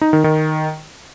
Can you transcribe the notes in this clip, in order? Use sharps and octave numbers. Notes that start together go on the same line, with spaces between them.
D#4
D#3
D#3